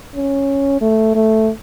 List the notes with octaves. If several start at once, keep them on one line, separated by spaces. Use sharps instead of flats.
C#4
A3
A3